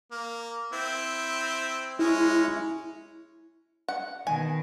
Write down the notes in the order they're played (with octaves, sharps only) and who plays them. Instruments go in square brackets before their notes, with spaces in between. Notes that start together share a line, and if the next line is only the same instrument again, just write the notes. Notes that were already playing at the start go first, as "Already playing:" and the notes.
[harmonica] A#3
C4 E4
[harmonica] G#3 C#4 [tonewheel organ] E4
[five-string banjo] F#5
[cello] B2 D#3 [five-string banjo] G#5